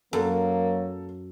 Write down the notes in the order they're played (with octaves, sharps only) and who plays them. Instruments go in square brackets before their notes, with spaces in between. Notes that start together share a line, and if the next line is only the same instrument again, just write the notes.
[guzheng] F#2 [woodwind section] F#3 [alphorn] A#3 [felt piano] A4